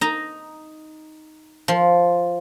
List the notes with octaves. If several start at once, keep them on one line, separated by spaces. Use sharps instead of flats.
D#4 A#5
F3